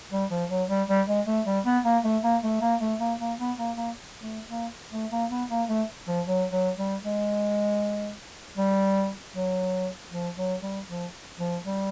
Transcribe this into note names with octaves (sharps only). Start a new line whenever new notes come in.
G3
F3
F#3
G3
G3
G#3
A3
G3
B3
A#3
A3
A#3
A3
A#3
A3
A#3
A#3
B3
A#3
A#3
A3
A#3
A3
A#3
B3
A#3
A3
F3
F#3
F#3
G3
G#3
G3
F#3
F3
F#3
G3
F3
F3
G3